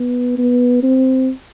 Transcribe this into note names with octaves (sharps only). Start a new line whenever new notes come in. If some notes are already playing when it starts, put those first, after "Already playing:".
Already playing: B3
B3
C4